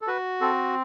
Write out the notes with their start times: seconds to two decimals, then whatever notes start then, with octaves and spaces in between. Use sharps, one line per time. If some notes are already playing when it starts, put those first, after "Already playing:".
0.01 A4
0.07 F#4 B4
0.41 C4 A4